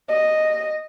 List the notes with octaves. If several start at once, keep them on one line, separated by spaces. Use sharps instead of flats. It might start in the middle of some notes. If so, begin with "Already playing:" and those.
D#5